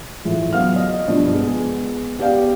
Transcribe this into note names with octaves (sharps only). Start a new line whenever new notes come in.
A2 E3 G#3 F4
F#3 B3 F5 F6
D#5
G2 B2 F3
G#3 B3 G#4
B3 G4 D5 F5 G5